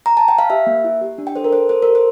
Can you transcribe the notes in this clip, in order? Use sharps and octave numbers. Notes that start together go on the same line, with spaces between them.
A#5
A5
G5
F5
G4 E5
A#3
E4
G4
D4
G5
A4 C5
A#4
A4 C5
A4 C5
G4 A#4
C5